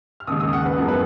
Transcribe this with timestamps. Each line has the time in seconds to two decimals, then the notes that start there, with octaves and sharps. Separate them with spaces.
0.20 F6
0.27 D#2 C#3 G#3 D#6
0.40 D#6
0.53 F#5
0.66 B4
0.78 F#2 F3 G#3 B3 A#4
0.88 B4